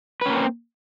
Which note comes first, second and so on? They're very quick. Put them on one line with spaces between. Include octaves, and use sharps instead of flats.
B4 C#4 A#3 C4